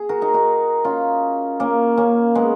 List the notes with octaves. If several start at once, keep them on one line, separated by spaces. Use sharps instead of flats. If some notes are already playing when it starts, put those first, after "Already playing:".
Already playing: G#4
F#4 A#4
D#4 F#4
D#4 F#4
C#4 F4
A#3 C#4
A#3 C#4
G#3 B3